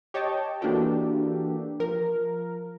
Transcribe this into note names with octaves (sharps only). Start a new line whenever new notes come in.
G4 C#5 D#5 G5 A5
E3 A#3 D4 F#4 G4 A4
F3 A#4